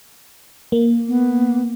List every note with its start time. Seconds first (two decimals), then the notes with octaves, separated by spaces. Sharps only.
0.72 A#3
1.08 B3